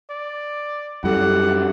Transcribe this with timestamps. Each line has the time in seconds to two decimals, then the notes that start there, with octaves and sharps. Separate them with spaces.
0.10 D5
1.04 F#2 G3 E4 G4 A4 F#5